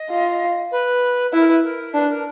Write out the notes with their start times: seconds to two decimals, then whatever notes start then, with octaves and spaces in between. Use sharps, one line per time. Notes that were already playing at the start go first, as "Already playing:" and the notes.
Already playing: D#5
0.10 F4
0.71 B4
1.32 E4 B4
1.39 A#4
1.47 B4
1.63 A#4
1.94 D4 B4
2.09 A#4